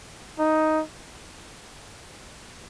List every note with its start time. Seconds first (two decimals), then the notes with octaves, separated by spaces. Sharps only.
0.39 D#4